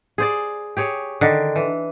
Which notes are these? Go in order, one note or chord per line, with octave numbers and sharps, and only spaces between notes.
G#4 C5 D5
G4 G#4 C#5
D3 D#3 D4
E3